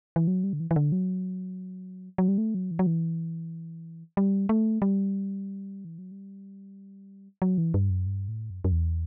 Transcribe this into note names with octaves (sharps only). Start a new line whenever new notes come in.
E3
F#3
G3
D3
E3
E3
D3
F#3
F#3
G3
A3
F#3
E3
F#3
E3
G3
A3
G3
E3
F#3
G3
F#3
E3
G2
F#2
G2
A2
F#2
F#2
E2